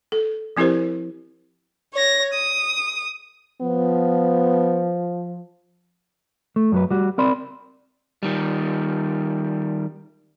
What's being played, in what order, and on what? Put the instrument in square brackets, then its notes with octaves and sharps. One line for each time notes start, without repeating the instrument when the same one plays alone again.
[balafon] A4
F3 C4 E4 G4 A#4 C5
[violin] C#5 A#6
D#6
[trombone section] F3 [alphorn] B3
[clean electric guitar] A3
F#2 F#3 B4
G3 F#4
C4 A#4 D5 B5 C6
[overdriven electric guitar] D#3 G3